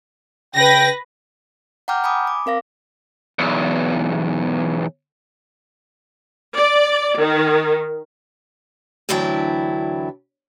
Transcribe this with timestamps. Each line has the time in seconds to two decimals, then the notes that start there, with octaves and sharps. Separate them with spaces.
0.55 C#3 B4 G5 A#6
1.88 F#5 G5 A#5 D6 F6 G6
2.04 G#5 B5 D6 D#6
2.27 D6
2.46 C4 A#4 F5 A#6
3.39 B1 E2
6.56 D5
7.19 D#3
9.09 D2 E3 F#3 D4 E4 G5